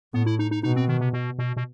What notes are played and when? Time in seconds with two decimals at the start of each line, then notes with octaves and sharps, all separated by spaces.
0.14 A2 B3
0.26 E4
0.39 D#4
0.51 D#4
0.63 B2 D#4
0.76 C4
0.88 D#3
1.00 C3
1.13 B2
1.38 B2
1.57 B2